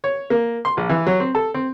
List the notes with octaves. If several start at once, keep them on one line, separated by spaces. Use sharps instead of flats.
C#5
A#3
C6
A#1
E3
F#3
C4
A4
C4